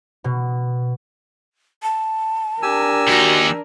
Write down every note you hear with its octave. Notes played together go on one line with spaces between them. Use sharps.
B2
A5
D4 G4 A#4 G#5 E6
D#2 D#4 F#4